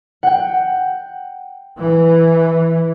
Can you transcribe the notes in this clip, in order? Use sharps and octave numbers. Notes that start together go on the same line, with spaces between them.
F#5 G5
E3